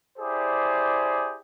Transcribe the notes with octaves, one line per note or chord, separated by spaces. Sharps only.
E4 G4 G#4 C5 D5